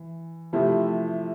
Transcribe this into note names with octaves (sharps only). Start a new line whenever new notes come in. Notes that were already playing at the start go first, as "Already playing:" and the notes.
Already playing: E3
C3 F3 A3 C4 E4